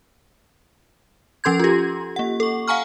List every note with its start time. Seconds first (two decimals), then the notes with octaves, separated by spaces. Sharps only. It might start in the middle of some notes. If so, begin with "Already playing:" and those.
1.44 F3 C#4 A4 C6 G6 G#6
1.60 F4 G4
2.16 A#3 F#5
2.40 A4 C#6
2.68 F5 F#5 G#5 A#5 C#6 F6